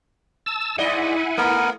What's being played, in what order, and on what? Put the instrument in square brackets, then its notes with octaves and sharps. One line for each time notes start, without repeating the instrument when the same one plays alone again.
[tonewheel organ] A5 E6
[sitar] G#2 D5 D#5 [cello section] E4 [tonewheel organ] F#5 G#5
[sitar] A3 [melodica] B3 A#4